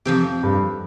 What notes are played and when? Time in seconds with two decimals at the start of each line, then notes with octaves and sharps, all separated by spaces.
0.05 F2 C3 F3 C4 G4
0.43 G2